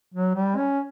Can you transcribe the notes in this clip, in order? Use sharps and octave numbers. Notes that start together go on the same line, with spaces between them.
F#3
G3
C#4